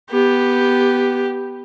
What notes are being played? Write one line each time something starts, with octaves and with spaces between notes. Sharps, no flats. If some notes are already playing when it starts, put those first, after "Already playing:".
B3 G4